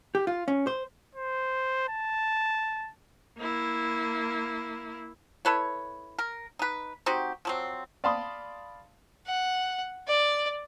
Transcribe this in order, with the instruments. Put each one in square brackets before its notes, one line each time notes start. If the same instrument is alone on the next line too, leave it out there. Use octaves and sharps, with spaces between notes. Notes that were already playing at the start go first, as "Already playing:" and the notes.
[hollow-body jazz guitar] G4
F4
C#4
C5
[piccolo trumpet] C5
A5
[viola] A#3 E4
[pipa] E4 A4 B4 C#5
A#4
D#4 B4
C4 D#4 F#4 G4
F3 F#3 C4
[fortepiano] D5 F5 A5 B5 C6 D#6
[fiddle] F#5
D5